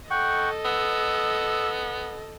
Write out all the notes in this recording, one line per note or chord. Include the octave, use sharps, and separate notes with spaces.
A4 D#5 F#5 G5 C#6
B3 E6